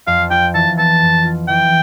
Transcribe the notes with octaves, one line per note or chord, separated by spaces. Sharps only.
F2 F5
F4 G5
E3 A5
B3 A5
F2
F4
E3 G5